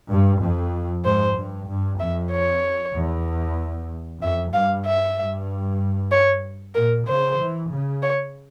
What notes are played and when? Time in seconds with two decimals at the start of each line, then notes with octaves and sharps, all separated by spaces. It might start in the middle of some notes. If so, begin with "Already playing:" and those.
0.10 G2
0.42 F2
1.05 G#2 C5
1.38 G2
1.69 G2
2.00 F2 E5
2.32 C#5
2.95 E2
4.22 F2 E5
4.53 G2 F5
4.85 E5
5.17 G2
6.11 C#5
6.75 A#2 A#4
7.07 C#3 C5
7.39 E3
7.70 C#3
8.02 C#5